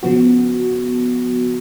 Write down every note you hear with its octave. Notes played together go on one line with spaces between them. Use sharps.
C#3 F3 B3 F#4